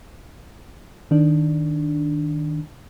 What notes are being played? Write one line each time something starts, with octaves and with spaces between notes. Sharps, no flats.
D#3 D4